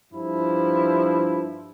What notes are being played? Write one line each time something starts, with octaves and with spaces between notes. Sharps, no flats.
G2 F3 E4